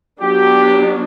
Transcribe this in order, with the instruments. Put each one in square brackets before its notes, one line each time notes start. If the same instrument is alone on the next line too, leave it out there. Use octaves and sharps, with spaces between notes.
[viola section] F#3 B3 D4 [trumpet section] G4